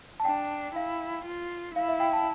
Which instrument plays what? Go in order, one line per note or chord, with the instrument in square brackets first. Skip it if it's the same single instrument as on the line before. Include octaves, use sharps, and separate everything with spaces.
[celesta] A5
[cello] D4 [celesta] G5
[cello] E4 [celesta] F5
[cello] F4
[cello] E4 [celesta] F5
[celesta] E5
G5
A5